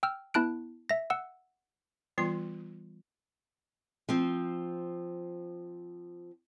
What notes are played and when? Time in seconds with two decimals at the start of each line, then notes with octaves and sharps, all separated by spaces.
0.03 G5 E6 F6
0.34 B3 E4 A5 F#6 D7
0.89 E5 A#6
1.10 F#5 E6
2.18 E3 G3 B3 F4 C6
4.09 F3 C4